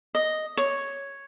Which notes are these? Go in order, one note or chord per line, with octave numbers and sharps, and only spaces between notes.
D#5
C#5